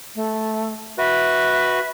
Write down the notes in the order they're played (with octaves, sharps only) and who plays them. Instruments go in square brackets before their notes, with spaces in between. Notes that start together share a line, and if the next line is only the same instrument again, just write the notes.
[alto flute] A3
[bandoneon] F#4 B4 [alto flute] E5